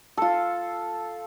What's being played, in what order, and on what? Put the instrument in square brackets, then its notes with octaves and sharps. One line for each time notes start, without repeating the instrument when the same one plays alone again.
[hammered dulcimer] F4 A4